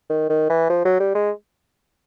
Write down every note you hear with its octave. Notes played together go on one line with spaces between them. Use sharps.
D#3
D#3
E3
F3
F#3
G3
G#3